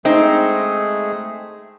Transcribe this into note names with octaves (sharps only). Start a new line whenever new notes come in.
G#3 A3 C4 D#4 G#4